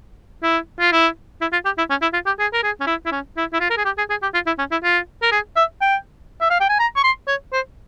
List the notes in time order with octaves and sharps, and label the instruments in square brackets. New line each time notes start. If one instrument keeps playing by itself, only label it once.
[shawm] E4
F4
E4
E4
F4
G4
E4
C#4
E4
F4
G4
G#4
A#4
G#4
C#4
E4
E4
C#4
E4
E4
F4
A#4
G#4
G4
G#4
G#4
G4
F4
E4
C#4
E4
F4
A#4
G#4
E5
G5
E5
F5
G5
G#5
A#5
C#6
C6
C#5
C5